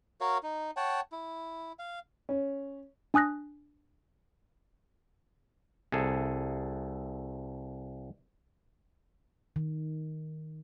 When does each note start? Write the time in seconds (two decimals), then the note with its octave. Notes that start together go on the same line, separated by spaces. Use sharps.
0.21 F#4 A#4 C#5 F5
0.43 D#4
0.77 C#5 F#5 G5 A5
1.12 E4
1.79 F5
2.29 C#4
3.14 D4 G#5 D#6 F#6 A#6
5.92 C2 G#4 A4
9.56 D#3